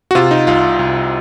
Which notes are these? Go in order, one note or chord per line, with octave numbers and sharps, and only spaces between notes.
F#4
C3 F4
D#4
C2 F4
C2